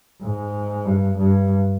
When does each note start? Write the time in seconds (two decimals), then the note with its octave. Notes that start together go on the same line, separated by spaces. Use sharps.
0.22 G#2
0.86 G2
1.18 G2